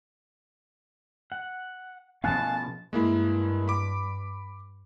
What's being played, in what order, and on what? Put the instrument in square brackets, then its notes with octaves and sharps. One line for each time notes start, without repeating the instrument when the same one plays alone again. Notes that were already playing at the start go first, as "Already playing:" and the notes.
[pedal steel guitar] F#5
[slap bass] B2 F3 C#4 [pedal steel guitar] F5 G#5 F#6 [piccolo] A5
[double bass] G2 [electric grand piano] G#3 A#3 E4
[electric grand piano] B5 D6